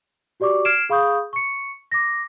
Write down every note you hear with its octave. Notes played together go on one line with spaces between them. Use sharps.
F#4 G4 D5 C#6 D6
F6 G#6 C7 D7 E7
G#4 F5 B5 C#6 D#6 G6
C#6 C#7
D6 A#6